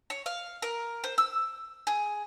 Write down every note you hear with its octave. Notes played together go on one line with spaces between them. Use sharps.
C#5
F5
A#4
C5
E6
G#4